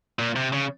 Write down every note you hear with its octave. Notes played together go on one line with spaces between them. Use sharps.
A#2
C3
C#3